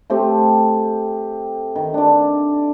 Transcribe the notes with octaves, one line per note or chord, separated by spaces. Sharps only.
A3 C4 G4 A4
D#3
D4 D5